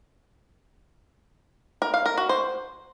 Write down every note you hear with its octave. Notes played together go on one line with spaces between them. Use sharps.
A#4
F5
A#4
F#4
C5